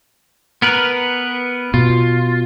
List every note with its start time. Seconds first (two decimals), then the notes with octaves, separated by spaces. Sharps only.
0.62 B3 A#4 B4
1.74 B2 F4